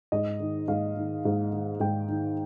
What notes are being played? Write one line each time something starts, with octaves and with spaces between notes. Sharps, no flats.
G#2 D#5
D#3
G#2 F5
D#3
G#2
D#3
G#2 G5
D#3